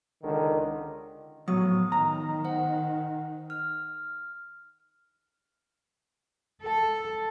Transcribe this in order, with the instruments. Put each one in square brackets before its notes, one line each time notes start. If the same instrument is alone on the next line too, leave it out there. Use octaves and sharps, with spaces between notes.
[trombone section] C#2 D3 D#3
[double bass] A2 F3 [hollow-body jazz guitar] F#3 [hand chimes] B3 D#6
[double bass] D#3 [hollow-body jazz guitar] A#5
[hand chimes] C5 F#5
F6
[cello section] A4